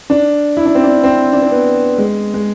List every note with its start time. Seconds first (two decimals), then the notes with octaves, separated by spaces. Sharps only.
0.10 D4
0.57 E4
0.66 D4
0.75 C4
0.84 D4
1.04 C4
1.33 D4
1.42 C4
1.51 B3
1.98 G#3
2.34 G#3